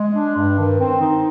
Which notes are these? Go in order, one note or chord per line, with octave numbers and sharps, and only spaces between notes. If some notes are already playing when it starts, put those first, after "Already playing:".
Already playing: G#3
D4
G2
D#3
C4
D#4